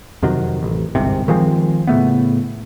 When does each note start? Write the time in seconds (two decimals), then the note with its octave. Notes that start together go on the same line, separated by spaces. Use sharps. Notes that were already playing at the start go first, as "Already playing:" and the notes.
0.22 F2 C3 D#3 F#3
0.63 A1
0.95 G1 C2 G#2 C3
1.28 D#3 F3 G#3 C4
1.87 A2 C#3 A3 B3